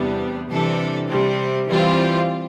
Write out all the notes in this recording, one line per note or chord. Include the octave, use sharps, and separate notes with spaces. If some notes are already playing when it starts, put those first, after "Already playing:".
Already playing: E2 C3 G3 B3 D4
C3 E3 G3 D4 A4
C3 G3 C4
E3 G3 C4 F4